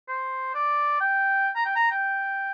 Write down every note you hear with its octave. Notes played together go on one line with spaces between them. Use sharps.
C5
D5
G5
A#5
G5
A#5
G5